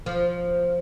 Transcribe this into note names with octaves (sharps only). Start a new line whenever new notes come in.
F3